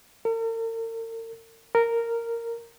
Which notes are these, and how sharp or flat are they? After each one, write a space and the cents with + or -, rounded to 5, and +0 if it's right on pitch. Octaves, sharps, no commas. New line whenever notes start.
A#4 -45
A#4 -10